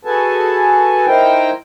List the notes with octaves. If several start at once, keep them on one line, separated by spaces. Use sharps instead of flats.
F#4 G#4 A4 B4 G#5 A5
D#4 E4 A#4 C5 G5